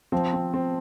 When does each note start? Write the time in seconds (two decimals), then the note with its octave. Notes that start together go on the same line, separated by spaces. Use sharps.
0.12 F3 C4
0.33 C4
0.54 C4